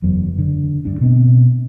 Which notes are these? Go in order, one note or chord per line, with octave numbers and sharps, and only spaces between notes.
F#1 E2 F#3 B3
F#1 D3
G1 G2 D4
B2 B3 C4